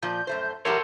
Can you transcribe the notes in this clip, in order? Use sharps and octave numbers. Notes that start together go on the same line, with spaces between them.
A#2 F3 G6
F#2 A3 C5
E3 F#3 G4 A4 A#4 C5 C#5